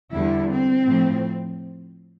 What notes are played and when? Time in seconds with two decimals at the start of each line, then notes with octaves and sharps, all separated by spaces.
0.13 E2 D3 G3 E4
0.51 C4
0.88 A2 F3